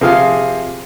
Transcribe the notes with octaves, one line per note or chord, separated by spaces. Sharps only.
C3 F3 G#4 F5